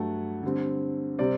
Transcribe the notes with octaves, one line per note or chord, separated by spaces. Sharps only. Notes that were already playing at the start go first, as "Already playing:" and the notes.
Already playing: G2 F#3 A3 F#5
D3 G3 C4
C3 G3 C4 D5